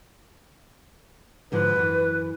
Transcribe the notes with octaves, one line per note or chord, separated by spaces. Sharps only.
G#2 D3 F3 B4
F#2 E3